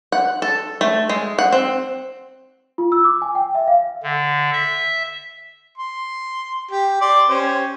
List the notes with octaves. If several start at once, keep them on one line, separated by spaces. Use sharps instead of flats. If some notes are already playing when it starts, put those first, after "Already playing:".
F#5
A4
A3
G#3
F#5
C4
F4
E6
D6
G#5
G5
E5
F5
D3
E5
C6
G4
D5 C6 D6
C#4 G4 C5